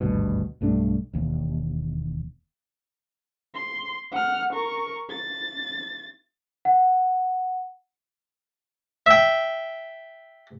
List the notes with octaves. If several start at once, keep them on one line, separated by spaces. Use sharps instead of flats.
G#1 D2 G2 B2
B1 G2 A3 D4
E1 D#2
C6
F#5 F6
A#4 C#6
A6
F#5
E5 G5